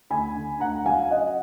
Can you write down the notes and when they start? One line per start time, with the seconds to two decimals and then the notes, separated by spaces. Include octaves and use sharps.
0.10 D2 G#5 B5
0.35 D3
0.60 D2 F#5 A#5
0.85 F#3 F5 G#5
1.11 F#2 D#5 F#5